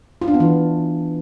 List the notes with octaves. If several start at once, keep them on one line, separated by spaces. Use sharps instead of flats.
F4
D4
B3
E3